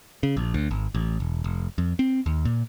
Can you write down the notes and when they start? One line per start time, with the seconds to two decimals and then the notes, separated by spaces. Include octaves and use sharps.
0.23 C#3
0.37 A#1
0.54 D2
0.71 G#1
0.95 A1
1.20 E1
1.44 F1
1.78 F2
1.99 C4
2.26 D#2
2.45 A#2